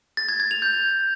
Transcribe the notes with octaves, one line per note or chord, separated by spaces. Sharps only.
A6
G#6
G#6
F7
G6